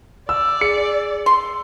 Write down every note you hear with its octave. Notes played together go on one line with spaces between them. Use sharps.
D5 E6
G#4 C#7
C6